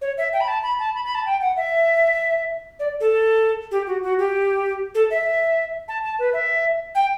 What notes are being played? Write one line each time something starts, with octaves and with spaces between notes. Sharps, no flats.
C#5
E5
G5
B5
A5
B5
A5
B5
B5
A5
G5
F#5
E5
D5
A4
G4
F#4
F#4
G4
A4
E5
A5
A5
B4
E5
G5